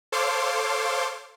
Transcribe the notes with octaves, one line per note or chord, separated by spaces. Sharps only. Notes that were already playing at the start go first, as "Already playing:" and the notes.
A4 C5 C#5 F5 C6 D6